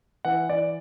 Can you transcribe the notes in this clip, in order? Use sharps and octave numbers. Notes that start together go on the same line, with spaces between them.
E3 F#5
E3 D5